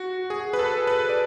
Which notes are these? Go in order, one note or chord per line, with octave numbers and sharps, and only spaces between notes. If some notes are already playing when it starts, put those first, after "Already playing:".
Already playing: F#4
G#4
B4
A4
B4
D5